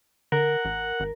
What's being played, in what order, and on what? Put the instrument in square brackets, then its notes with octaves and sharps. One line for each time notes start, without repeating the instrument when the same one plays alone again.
[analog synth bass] D3 [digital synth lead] A#4 [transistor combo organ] F#5
[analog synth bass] A1
G#1